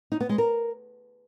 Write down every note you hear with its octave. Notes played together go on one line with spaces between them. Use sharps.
D#4
B3
G#3
A#4